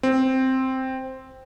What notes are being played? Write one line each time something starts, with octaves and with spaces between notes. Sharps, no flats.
C4